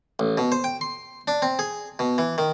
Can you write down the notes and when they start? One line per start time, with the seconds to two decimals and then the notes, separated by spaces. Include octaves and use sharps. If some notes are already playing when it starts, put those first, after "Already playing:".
0.19 A1
0.38 B2
0.52 C5
0.64 G5
0.81 C6
1.28 D4
1.42 C4
1.59 G#4
1.99 B2
2.18 E3
2.38 D#3